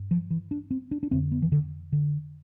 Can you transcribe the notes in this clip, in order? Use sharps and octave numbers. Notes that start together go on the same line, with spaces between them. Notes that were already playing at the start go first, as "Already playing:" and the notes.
Already playing: G2
F3
E3
D4
C4
D4
D4
F2 D3 C4
B3
E3
D3
D3